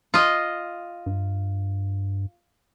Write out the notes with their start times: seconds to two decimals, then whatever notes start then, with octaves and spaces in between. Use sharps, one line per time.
0.14 F4 D#5
1.06 G2